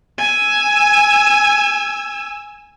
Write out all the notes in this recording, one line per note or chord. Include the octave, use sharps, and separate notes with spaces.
G#5 E6